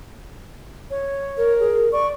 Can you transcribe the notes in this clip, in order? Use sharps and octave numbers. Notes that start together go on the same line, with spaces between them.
C#5
A#4
G#4
D5 C#6